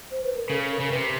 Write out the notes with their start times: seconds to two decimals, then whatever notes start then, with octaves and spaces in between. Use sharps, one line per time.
0.11 C5
0.24 B4
0.37 A#4
0.49 C#3 A4
0.71 A#4
0.80 C#3
0.91 C3 B4